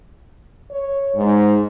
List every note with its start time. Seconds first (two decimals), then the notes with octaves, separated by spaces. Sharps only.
0.70 C#5
1.15 G#2